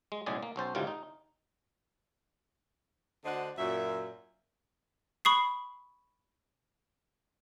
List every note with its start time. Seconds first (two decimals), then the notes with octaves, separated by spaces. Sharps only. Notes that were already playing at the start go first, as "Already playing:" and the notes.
0.12 G#3
0.26 B1 A2 C#3 G#3 G#4 D5
0.43 A#3
0.56 B1 C#4 C5 A5
0.75 G#1 D2 A2 C3 G3 F4
0.87 D#4
3.25 D2 D3 D4 C5 D#5 F#5
3.58 F#2 A#2 E5
5.25 B5 C#6 D#6 C7